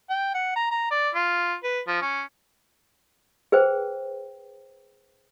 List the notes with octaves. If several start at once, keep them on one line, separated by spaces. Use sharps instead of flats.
G5
F#5
A#5
A#5
D5
F4
B4
F3
C#4
G#4 B4 C5 G5